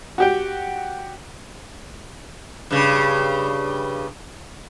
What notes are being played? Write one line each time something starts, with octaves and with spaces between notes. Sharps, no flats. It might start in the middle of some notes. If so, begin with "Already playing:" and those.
F#4 G4 G5
G2 C#3